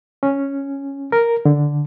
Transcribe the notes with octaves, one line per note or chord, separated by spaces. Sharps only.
C#4
A#4
D3